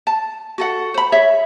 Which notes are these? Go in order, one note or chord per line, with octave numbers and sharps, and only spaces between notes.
A5
F#4 A4 F#5
C5 B5
G#4 C#5 E5